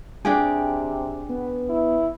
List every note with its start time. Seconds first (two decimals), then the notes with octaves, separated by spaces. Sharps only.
0.25 C3 D4 G4 G#4
1.29 B3
1.69 E4